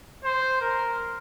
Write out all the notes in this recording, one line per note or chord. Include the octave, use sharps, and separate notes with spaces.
C5
A#4